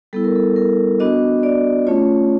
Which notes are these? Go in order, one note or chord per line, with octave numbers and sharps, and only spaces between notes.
G3 B3 E4 A4
A#4
A4
A#4
B3 D4 F#4 D#5
D5
A3 C#4 F4 C#5